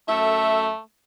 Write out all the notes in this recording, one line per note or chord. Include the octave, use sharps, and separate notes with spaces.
F#2 A3 A4 E5